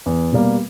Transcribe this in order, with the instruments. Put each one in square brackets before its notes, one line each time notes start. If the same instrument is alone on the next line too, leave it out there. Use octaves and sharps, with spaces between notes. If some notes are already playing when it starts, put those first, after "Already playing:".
[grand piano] E2
B2 G3 A#3